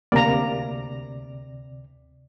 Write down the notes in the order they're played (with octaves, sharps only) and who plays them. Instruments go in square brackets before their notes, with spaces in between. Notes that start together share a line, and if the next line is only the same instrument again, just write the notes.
[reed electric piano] D2 C3 D5 [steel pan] A#3 A#5